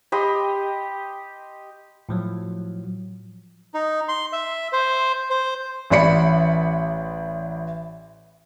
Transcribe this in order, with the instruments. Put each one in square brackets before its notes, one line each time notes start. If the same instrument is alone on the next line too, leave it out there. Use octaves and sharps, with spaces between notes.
[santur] G4 D#5 B5 C6
[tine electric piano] A2 F3 F#3
[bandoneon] D#4
C6
E5
C5
C5
[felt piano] A1 E3 D5 B5 C#7